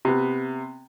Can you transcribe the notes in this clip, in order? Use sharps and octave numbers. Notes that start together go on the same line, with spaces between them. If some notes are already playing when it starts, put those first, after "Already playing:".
C3 B3